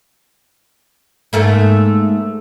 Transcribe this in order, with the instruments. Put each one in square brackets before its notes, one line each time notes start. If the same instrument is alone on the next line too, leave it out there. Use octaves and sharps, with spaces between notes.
[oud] G#2 A3 A#3